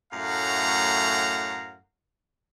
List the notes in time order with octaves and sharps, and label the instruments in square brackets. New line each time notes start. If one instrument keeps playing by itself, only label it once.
[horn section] F#2 A2 A3 F5 F#5 A#5